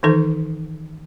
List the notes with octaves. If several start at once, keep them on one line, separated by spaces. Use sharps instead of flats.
D#3 E3 D#4 A4 C5